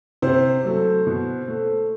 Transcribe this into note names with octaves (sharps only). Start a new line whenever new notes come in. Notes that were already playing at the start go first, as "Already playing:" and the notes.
C3 C5
F#3 A3
B2
A3